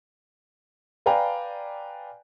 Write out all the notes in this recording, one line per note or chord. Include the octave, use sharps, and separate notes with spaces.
B4 D5 F5 G5 G#5 A#5